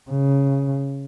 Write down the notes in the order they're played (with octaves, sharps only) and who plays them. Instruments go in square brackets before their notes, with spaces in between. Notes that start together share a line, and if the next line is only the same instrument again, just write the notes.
[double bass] C#3